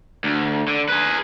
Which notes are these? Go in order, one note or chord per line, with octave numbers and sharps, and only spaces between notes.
D2
D3
G#4 B4